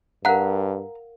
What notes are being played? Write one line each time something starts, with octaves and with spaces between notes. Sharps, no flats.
G2 A#4 F5 F#5 A#5 F#6